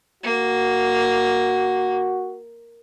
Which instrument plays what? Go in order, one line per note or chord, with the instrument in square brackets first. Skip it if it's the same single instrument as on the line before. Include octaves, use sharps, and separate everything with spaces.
[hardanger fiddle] A#3 [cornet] F#4